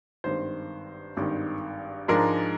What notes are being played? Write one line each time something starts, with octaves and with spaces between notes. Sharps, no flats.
G#1 G2 D#3 C5
G#1 G2 D#3
G#2 F3 G#3 D4 A#4